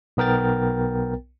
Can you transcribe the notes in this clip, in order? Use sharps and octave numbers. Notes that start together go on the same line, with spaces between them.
B1 B3 A#4 G5 A6